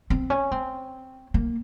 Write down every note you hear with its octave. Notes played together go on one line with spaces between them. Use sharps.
C4
C#4
C4
A#3